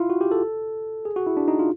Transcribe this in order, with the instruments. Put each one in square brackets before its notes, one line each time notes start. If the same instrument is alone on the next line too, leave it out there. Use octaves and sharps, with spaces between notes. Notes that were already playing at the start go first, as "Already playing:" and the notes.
Already playing: [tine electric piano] E4 F4
F#4
G4
A4
G#4
F#4
E4
D4
D#4
F4